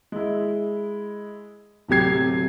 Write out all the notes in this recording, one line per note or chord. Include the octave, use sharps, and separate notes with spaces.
G#3 E4
D1 C3 F#3 G4 G#6 C7